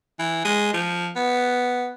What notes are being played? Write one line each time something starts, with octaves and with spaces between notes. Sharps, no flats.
E3
G#3
F3
B3